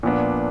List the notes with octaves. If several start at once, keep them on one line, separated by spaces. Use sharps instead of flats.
A#2 F3 B3 D4